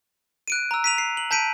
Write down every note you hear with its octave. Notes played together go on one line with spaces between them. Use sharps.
F#6 D7 D#7
A#5 E6
B6 D#7 F7
C7
F#7
A5 G6 B6 D7 D#7